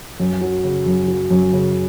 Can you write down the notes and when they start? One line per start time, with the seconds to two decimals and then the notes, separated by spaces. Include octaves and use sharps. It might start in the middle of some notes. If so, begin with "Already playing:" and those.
0.20 F#2
0.41 F#3
0.64 C#3
0.86 F#2
1.08 F#3
1.31 F#2
1.53 C#3